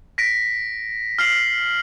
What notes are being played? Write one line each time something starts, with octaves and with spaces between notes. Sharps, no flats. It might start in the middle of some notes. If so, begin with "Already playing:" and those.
A#6 B6 D7
F6 C7 F#7